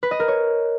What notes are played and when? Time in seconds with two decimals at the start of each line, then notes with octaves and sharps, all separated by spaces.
0.03 B4
0.11 D#5
0.20 A#4
0.28 C#5